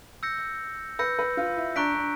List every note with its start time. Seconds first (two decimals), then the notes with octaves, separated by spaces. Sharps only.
0.23 E6 G6 A#6 C#7
0.99 B4 E6 G6 A#6 C#7
1.19 B4
1.37 F4
1.57 E4
1.76 D4 A#5 C#6 F#6 B6 D7
1.95 D4